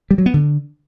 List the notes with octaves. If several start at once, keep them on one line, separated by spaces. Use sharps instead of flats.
G3
F#3
B3
D3